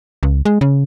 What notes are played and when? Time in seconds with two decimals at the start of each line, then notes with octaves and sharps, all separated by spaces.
0.23 C#2
0.45 G#3
0.61 C#3